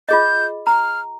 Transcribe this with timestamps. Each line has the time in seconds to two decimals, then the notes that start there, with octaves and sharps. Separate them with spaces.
0.09 F4 G#4 D#5 G6
0.67 A#5 F6